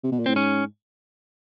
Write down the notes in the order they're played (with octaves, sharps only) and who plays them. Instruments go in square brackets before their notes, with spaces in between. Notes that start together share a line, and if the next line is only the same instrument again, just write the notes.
[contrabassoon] C3
B2
A#2
[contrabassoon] A2 [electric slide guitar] C4
[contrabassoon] G#2 [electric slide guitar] C#4